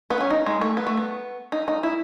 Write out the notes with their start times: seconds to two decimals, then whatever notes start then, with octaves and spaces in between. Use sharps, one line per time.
0.10 B3
0.21 C#4
0.30 D#4
0.46 G#3
0.61 A3
0.77 B3
0.87 A3
0.97 B3
1.52 D#4
1.68 D#4
1.83 E4